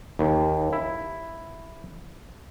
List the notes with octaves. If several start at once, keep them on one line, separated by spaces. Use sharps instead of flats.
D#2
E4